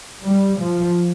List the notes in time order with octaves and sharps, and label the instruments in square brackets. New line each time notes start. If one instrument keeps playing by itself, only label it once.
[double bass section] G3
F3